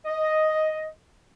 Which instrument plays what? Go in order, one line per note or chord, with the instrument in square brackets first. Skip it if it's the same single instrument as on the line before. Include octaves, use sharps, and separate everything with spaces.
[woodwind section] D#5